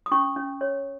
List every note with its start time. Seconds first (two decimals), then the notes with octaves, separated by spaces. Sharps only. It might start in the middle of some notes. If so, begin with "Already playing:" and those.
0.06 D#6
0.12 C#4 C#6
0.36 C#4
0.61 C#5